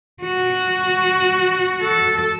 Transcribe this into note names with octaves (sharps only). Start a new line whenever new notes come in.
F#4
A4